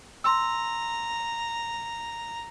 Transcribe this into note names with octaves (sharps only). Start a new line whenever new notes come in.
A#5 C6 E6